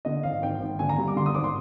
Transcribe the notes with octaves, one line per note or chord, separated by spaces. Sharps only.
D3 D#5
G#1 F5
G#1 G5
G#1
D3 G#5
A#5
G2
D6
D3 C6
D#6
G#1 D6
C6